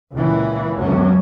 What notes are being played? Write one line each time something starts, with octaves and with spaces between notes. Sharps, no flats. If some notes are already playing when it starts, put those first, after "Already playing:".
C#2 A#2 C#3 E3
F#1 C#2 F#2 F#3 C#4